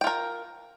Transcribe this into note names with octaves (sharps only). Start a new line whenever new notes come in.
F4 A#4 G5